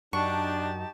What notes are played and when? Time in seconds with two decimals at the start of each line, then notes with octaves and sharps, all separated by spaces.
0.13 F#2 D4 D#4 G4 A5 C#6